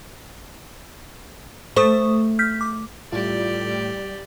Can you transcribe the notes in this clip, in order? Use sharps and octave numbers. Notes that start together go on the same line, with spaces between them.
A3 C5 C#6 D#6
F6 G6 B6
D6
A2 G3 F4 G4 D5